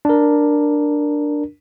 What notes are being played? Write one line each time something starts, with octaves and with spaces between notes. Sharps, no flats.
D4 A#4